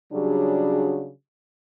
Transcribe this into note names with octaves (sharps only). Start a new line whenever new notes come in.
C#3 F#3 G3 D4 F#4 G#4